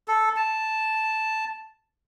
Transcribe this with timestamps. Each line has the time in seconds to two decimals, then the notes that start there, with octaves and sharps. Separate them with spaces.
0.08 A4
0.36 A5